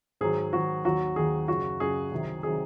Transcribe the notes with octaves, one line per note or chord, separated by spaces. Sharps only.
G#2 D#3 F#3 G#4
G#2 D#3 F#3 F#4
D#2 D#3 F#3 F#4
D#2 D#3 F#3 G#4
F#2 C#3 F#3 F#4
F#2 C#3 F#3 G#4
C2 C3 D#3 F#3
C3 D#3 F#3 G#4